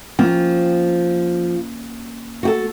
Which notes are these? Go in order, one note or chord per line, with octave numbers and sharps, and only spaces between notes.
F3 A#3 C#4 G5
F#4 G4 A4